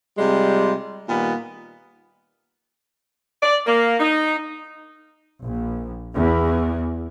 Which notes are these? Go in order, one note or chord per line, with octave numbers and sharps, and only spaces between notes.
C3 G3 G#3 F4
A#2 D#3 G3 B3
D5
A#3
D#4
A#1
E2